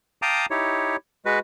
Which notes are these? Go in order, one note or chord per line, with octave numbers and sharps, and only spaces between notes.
F5 G5 A5 A#5 D6 D#6
D#4 E4 G4 C#5
G#3 F#4 B4